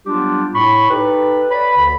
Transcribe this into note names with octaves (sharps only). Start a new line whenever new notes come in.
F#3 G3 B3 D4 F4 G4
A2 B5 C#6
D#4 G4 A4 B4
B4 C#5 D5 B5
D2 D3 B5